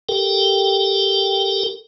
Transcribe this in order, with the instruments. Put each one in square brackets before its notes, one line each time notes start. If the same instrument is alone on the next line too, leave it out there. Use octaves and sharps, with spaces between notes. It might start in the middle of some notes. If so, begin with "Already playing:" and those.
[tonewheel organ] G4 A4 A#4 G5